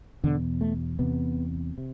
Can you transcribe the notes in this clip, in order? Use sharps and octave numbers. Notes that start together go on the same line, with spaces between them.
E2 B2 D3
A3
E2 C3 B3
C3